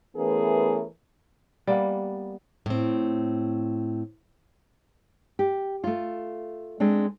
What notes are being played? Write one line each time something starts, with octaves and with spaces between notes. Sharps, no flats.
E3 A3 B3 C#4 G#4 A#4
G3 A#3 B3
A2 C4
G4
A3 F4
G#3 C4 D4